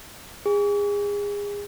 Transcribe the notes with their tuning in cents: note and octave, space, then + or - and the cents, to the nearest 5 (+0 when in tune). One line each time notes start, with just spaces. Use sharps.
G#4 -30